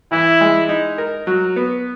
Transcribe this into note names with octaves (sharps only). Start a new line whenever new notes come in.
E3 E4
G#3
D#4
A#4
F#3
B3